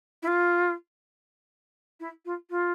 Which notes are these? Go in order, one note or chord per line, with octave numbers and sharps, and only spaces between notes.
E4
F4
E4
F4
F4